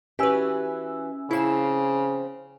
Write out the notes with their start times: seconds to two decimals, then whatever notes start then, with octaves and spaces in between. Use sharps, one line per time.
0.19 E3 C#4 F#4 G4 B4 G#5 E6
1.31 C#3 F3 C4 E4 C7 E7